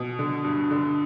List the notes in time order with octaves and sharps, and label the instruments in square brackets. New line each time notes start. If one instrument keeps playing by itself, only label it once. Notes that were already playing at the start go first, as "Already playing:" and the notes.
Already playing: [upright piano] B2
D3
G2
D3